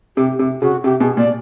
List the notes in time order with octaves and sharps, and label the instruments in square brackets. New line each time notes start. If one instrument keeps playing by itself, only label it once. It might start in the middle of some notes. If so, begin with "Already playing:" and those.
[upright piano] C3 [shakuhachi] G4
[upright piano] C3
[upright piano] C#3 [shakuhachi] F#4
[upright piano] C3 [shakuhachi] G4
[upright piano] B2 [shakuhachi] G#4
[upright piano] A#2 [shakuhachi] D5